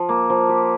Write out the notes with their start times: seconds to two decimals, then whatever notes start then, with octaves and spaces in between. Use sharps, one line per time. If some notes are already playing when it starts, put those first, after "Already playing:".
Already playing: F3
0.09 A#3
0.30 F3
0.49 G4